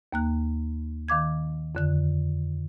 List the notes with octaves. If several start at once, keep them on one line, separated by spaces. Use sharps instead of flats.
D#2 A#3 F#6
D#3 F5 D6 G#6
F2 D3 F#6